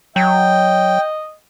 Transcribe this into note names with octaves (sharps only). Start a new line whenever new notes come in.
F#3 D#5 G5